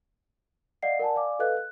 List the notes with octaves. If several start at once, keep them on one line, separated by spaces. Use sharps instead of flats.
D5 D#5 F5 F#5 C7
A#4 D5 F#5 G#5 A5
D5 F5 G#5 D6
A4 B4 D#5 F5 F#6
F#6